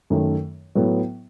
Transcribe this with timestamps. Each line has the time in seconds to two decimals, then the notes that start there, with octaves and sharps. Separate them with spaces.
0.10 F#2 D#3 A3
0.75 A2 F#3 B3